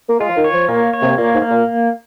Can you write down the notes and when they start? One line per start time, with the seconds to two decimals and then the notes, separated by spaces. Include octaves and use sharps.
0.09 A#3
0.20 G#3 F4
0.29 F3
0.36 D#3
0.44 C#5
0.53 F3
0.69 A#2 A#3
0.93 C#5
1.02 C3
1.18 A#2 A#3
1.34 G#2
1.42 A#3
1.51 A#2